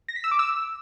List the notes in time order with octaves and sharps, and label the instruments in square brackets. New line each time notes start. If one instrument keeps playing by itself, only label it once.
[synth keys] A#6
B6
E6
D6
E6